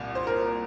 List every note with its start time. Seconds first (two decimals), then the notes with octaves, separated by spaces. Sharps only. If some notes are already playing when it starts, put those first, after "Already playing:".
Already playing: C2 A#2
0.15 C5
0.27 A#4